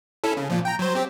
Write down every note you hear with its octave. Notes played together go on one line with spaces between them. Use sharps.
C#4 E4 A4
C#3
A#2 F3
G5 A#5
F#3 C5
C4 G4